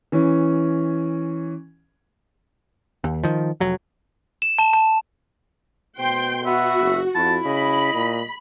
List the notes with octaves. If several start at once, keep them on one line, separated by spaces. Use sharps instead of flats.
E3 C#4
D#2
D#3 F3
F1 F#3
E7
A5
A5
B2 C5 G5 C6
B3 F#4 E5
F#1
F2 E4 A5
C#3 D#5 B5
A#2